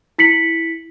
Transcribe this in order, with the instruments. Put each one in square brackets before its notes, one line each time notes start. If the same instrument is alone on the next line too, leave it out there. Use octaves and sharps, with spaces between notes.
[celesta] E4 B6 C#7 F#7